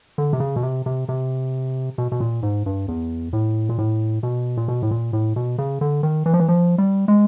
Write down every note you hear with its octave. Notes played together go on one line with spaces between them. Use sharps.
D3
C3
C#3
B2
C3
C3
C3
B2
B2
A#2
G#2
G2
E2
A2
A#2
A2
B2
A#2
B2
A2
A#2
A2
B2
C#3
D3
D#3
E3
F3
E3
F3
G3
G#3